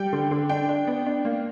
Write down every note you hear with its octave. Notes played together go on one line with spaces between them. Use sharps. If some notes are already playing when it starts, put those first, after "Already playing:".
Already playing: G3 G5
D3
D3
D4 G5
D4
B3
D4
A#3